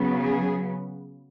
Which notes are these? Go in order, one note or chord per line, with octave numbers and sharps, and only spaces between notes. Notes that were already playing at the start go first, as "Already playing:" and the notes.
Already playing: C#3 F#3 B3
G#4